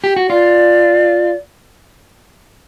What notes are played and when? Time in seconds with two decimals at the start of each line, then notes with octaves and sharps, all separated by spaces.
0.04 G4
0.16 F#4
0.29 F4 D5